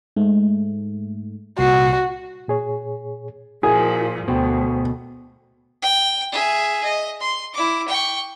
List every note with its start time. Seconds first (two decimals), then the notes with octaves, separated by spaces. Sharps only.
0.16 G#2 A3
1.59 C2 A#2 F#4 C7
2.48 A#2 G#4 C#5
3.63 A#2 F3 E4 F#4 G#4 A#4
4.28 D2 B2 C5 G5
5.82 G5
6.32 G#4 E5
6.83 D#5
7.20 C6
7.53 E4 D6
7.88 G5 C#6